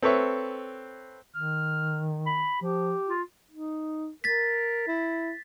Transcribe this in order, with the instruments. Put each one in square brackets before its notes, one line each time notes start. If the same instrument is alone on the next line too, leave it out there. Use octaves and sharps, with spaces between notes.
[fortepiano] C4 A4 B4 C#5 E5
[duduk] D#3 [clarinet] F6
[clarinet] B5
[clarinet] F3 [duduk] G4
[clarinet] F4
[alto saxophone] D#4
[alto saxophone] A#4 [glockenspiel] A6 B6
[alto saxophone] E4